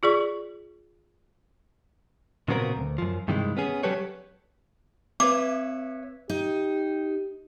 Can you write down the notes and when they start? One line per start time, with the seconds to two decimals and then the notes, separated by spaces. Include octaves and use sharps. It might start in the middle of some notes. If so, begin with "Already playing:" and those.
0.03 F4 G#4 D5 C#6
2.48 A#2 C#3 F#3 B3 C4 A#4
2.76 D2
2.98 F#2 F3
3.28 G2 C3 D#3 E3 G#3
3.57 B3 C#4 G#4
3.83 F#3 G3 G4 A4 B4 C#5
5.20 C4 B4 C#5 E5 D6
6.30 D#4 G4